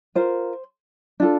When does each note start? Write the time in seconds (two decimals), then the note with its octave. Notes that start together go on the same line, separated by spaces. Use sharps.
0.15 F4 A#4 C5
1.20 D4 F4 A4